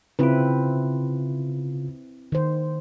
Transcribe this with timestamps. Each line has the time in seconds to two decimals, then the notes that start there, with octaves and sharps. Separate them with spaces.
0.19 C#3 C4 E4 F4 B4
2.32 D#3 C5